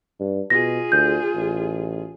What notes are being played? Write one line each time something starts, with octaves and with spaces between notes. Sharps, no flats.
G2
B2 F4 G#4 A#6
D2 G6
A1